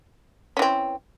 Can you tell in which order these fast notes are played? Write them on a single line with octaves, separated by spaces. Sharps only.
C#4 E3 C4